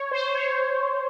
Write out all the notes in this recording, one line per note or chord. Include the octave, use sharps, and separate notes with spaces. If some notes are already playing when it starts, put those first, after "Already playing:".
Already playing: C#5
C5
C#5